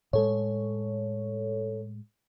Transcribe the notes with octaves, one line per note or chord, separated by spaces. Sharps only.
A2 G#3 A4 C#5